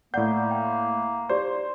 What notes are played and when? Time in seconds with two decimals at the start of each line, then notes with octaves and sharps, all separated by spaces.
0.14 A2 A#3 D5 F#5 G6
0.51 G5
1.29 D#4 G4 C5 D5